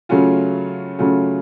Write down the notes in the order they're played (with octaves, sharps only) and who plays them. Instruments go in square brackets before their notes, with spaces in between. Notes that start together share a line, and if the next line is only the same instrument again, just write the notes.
[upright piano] C#3 F#3 A3 C#4 F4
C#3 F#3 A3 C#4 F4